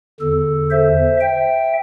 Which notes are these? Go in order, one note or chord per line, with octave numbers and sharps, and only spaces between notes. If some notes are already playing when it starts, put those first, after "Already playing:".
E2 D3 A4
C5 E5
E5 G5